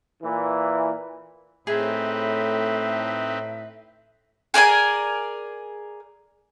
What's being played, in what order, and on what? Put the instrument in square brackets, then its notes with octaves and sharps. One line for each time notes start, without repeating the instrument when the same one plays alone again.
[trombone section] A#2 E3
[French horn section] A2 [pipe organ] C4 D#4 B4 [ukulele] G#4 [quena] E5
[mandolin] G#4 A#4 D5 G#5